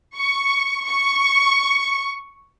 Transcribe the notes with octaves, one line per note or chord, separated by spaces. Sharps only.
C#6
C#6